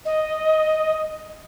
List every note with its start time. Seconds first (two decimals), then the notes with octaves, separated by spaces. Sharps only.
0.05 D#5